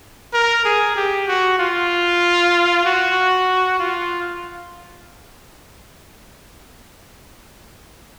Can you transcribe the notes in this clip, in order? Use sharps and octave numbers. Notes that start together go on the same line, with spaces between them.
A#4
G#4
G4
F#4
F4
F#4
F4